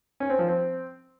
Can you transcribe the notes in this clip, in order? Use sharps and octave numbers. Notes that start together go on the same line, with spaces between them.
C#4
C4
F3
C4